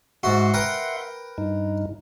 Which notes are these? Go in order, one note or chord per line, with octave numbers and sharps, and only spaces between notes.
G#2 F#4 E5 F#5 C6
A#4 B4 G5
G2 D#4